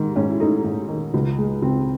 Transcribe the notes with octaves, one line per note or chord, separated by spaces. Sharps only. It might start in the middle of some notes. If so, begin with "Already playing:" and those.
Already playing: G#2 D#3
G#2 C#4
E4
A3 D#4
G#2
D#3
C#2
G#3
C#2 C4